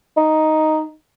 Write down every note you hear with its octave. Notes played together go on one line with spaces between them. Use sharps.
D#4